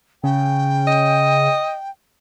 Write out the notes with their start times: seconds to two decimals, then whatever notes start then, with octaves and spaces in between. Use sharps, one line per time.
0.24 C#3 G5
0.87 D#5